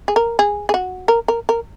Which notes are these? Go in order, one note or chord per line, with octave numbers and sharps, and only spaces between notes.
G#4
A#4
G#4
G#4
F#4
A#4
A#4
A#4